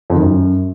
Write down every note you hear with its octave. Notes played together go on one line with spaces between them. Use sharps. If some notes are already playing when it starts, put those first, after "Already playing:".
F2
D#3
F#2